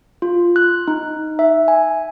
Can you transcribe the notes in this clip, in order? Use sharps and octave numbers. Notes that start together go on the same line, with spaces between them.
F4
F#6
D#4
E5
G#5